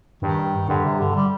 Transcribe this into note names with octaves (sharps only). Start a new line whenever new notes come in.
G2 D#3
G2 D3
C3
D3
G3